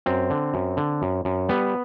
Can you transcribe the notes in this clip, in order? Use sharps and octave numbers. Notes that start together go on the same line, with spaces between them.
F#2 C4
D3
F#2
D3
F#2
F#2
G3 B3